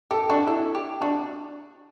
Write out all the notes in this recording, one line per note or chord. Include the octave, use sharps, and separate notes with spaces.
G4 A4
D4 F#4
E4 A4
G4
D4 F#4